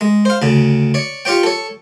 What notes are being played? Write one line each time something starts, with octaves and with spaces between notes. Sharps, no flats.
G#3
C5 F5
D2 C#3
C#5 D5
F4 G4 C#5 G5
A4 C#5